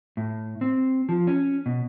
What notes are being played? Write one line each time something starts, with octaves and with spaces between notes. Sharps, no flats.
A2
C4
F3
C#4
B2